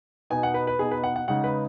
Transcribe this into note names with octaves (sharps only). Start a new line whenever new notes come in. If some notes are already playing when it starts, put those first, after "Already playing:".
B2 B3 D#4 G#5
F#5
B4
B4
B2 B3 D#4 G#4
B4
F#5
F#5
C#3 G#3 D#4 F#5
B4